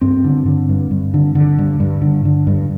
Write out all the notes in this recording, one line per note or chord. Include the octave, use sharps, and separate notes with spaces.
G2 C4
D3
D3
G2
G2
D3
D3
G2
G2
D3
D3
G2